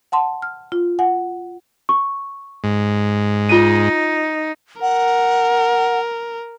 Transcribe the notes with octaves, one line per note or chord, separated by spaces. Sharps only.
F#5 A5 C6
F6
F4
F#5 G#5
C#6
G#2
D#4 F4 D#7
A#4 F#5